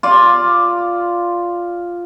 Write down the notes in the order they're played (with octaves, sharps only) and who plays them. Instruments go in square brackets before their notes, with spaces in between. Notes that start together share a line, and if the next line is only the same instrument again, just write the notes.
[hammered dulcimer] F4 D5